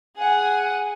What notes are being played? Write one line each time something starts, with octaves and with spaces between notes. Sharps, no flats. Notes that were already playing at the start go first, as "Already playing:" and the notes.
G#4 F#5 G#5